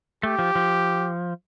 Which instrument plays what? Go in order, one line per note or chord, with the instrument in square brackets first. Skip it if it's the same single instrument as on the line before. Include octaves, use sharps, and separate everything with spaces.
[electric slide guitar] A3 [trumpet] G4
[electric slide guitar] F3
F3